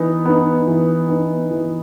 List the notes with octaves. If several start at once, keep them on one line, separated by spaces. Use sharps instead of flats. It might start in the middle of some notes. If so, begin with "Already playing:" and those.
Already playing: E3 B3 D#4
B3 D#4
E3
B3 D#4
E3